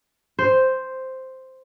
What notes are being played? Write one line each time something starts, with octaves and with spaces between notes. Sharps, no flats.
C5